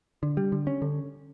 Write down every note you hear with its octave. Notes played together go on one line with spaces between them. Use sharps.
D3
G3
D3
C#4
D3